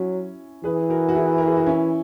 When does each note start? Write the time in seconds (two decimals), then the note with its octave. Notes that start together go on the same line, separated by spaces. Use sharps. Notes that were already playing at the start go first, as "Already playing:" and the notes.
Already playing: F#3 C#4 E4
0.64 E3 G#4 B4
0.89 F#4 A#4
1.09 F#4
1.15 E4 G#4
1.38 A#4
1.47 G#4
1.57 F#4
1.66 C#4 E4